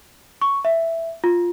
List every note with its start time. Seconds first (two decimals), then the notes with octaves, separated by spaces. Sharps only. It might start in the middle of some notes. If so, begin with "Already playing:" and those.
0.42 C#6
0.65 E5
1.24 F4